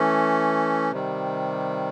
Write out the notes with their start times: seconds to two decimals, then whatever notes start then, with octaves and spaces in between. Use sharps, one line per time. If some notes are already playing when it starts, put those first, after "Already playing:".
Already playing: E3 A3 C#4
0.92 C3 D#3 G3